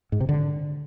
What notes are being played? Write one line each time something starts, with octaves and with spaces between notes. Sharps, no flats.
G#2
C3
D3